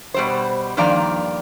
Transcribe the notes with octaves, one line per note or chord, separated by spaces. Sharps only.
B2 G3 C5
G2 D#3 F3 A#3 D5 A#5